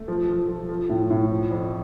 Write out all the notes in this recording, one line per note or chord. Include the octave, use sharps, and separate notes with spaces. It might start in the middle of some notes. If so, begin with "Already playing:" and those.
Already playing: A3
F3
F3
F3
F3
A2
A2
F3
F2